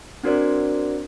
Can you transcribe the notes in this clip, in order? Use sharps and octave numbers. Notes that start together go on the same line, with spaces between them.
C4 D4 F#4 A#4 C5 D5